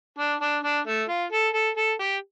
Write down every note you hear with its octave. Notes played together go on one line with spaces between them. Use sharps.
D4
D4
D4
A3
F4
A4
A4
A4
G4